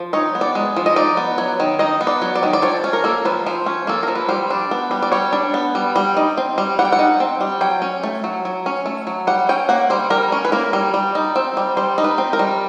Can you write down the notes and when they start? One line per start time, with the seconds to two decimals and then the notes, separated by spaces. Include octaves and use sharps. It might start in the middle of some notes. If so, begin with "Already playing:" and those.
Already playing: F3
0.13 D#4 C#5
0.35 B3
0.41 D5
0.55 G#3
0.76 F3
0.86 D#5
0.96 D#4 D5
1.17 B3
1.38 F#3
1.60 D#3
1.79 D#4 D#5
2.01 B3
2.07 D5
2.22 F#3
2.35 D5
2.43 D#3
2.53 D5
2.62 F3 C#5
2.84 C#4
2.93 A#4
3.04 A#3 A4
3.25 F3 B4
3.46 F3 C5
3.66 C#4
3.87 A#3 A4
4.03 F3 A#4
4.15 B4
4.29 G3 C5
4.50 D4
4.71 B3
4.91 G3
5.02 D5
5.12 G3 C#5
5.33 D4
5.54 B3
5.75 G3
5.96 G3
6.17 D#4
6.38 C4
6.58 G3
6.79 G3 F#5
6.85 G5
6.92 F#5
6.99 D#4
7.20 C4
7.41 G3
7.61 F#3 G5
7.82 C#4
8.03 A3
8.24 F#3
8.45 F#3
8.66 C#4
8.86 A3
9.07 F#3
9.27 G3 F#5
9.49 C#4 G5
9.69 A#3 F#5
9.90 G3 C5
10.10 G3 A#4
10.32 C#4
10.45 B4
10.52 A#3 A#4
10.73 G3
10.94 G3
11.15 D#4
11.36 C4
11.57 G3
11.77 G3 C5
11.98 D#4
12.04 B4
12.18 C4
12.33 A#4
12.39 G3